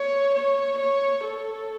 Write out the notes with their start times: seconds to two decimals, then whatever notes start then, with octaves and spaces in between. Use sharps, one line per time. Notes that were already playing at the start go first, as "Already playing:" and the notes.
Already playing: C#5
0.35 C#5
0.79 C#5
1.24 A4